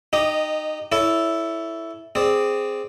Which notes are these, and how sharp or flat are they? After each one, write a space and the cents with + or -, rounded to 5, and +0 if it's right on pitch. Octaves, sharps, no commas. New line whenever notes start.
D#4 -20 G4 +0 D#5 +0
E4 +0 A4 +0 C#5 +30
C4 +0 G#4 +0 D5 +0